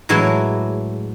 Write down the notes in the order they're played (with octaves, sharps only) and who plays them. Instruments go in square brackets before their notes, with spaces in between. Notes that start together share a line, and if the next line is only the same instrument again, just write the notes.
[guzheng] A2 E3 F#3 G#3 E4